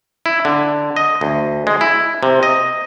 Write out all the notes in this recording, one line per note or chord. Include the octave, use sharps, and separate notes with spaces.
E4
D3
D#5
D2
G#3
E4
C3
D#5